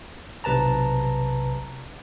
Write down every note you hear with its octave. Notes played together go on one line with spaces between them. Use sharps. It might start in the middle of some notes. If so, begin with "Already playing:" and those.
B1 C3 B4 A5 A#5